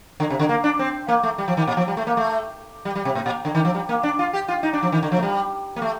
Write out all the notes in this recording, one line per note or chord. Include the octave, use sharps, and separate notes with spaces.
D3
C3
D3
A#3
D4
C4
A#3
A3
G3
F3
D#3
A#2
F3
G3
A3
A#3
A3
G3
G3
C3
A2
A#2
D3
D#3
F3
G3
A#3
D4
F4
G4
F4
D#4
D4
F3
D#3
D3
F3
A3
G3
A#3
A3